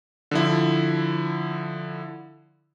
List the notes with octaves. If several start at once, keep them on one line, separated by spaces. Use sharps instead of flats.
D3 F3 E4